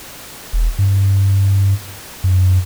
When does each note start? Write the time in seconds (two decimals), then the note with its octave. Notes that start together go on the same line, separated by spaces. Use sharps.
0.53 E1
0.79 G2
2.24 F#2